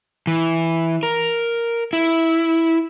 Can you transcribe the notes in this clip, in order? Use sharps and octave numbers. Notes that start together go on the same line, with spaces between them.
E3
A#4
E4